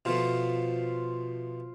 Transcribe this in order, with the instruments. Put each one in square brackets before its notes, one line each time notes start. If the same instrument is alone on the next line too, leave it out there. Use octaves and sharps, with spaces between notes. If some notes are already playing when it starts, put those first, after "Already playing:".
[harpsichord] B2 F3 A3 [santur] F4 C5 F5